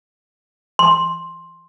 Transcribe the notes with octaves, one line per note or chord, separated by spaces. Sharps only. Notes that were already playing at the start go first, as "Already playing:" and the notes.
C6